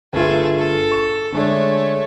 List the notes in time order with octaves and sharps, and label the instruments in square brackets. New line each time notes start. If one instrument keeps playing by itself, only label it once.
[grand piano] G1 F4 [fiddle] A3 G#4
[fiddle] A4
[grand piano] C#6 E7
[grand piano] D3 G#3 D4 [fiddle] A3 C#5